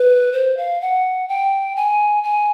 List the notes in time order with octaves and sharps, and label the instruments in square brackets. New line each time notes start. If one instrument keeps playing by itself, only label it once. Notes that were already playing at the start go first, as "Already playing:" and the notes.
Already playing: [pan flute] B4
C5
F5
F#5
G5
G#5
G#5